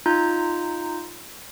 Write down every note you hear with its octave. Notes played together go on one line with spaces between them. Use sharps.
D#4 F4 A#5 G6